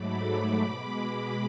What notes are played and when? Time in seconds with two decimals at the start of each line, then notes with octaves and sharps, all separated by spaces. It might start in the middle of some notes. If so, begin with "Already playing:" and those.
Already playing: G#2 F#3 A3 B5 D6
0.62 B2 G#3